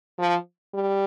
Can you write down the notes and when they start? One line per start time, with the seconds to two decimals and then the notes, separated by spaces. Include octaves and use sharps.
0.19 F3
0.74 G3